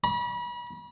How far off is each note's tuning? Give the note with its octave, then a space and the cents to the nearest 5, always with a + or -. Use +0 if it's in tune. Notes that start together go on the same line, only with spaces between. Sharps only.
B5 -35